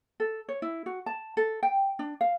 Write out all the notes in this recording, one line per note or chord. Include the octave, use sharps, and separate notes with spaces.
A4
C#5
E4
F#4
A5
A4
G5
D4
F5